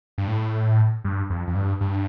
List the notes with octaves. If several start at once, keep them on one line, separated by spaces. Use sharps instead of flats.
G2
A2
G2
F2
F2
G2
G2